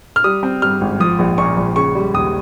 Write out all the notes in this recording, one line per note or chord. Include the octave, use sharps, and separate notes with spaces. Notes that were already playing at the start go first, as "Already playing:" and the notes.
F6
G3 D#6
C4
G2 F6
G#1
F3 D#6
A#1
A#2 C#6
A#1
C#3 C#6
G3
D#2 D#6